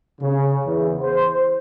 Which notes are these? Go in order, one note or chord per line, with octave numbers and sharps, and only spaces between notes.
C#3
E2
C5